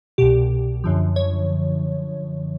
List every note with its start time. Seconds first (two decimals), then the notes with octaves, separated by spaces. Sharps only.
0.18 C2 B2 G4
0.84 F#2 D3 F3
1.16 C#5